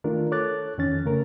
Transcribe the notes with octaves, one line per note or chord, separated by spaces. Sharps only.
D#3 A3 D4 F4 A#4
A4 C#5 D6 F#6 A6
F2 D#3 C#4 A6
C#3 A3 C#4 A#4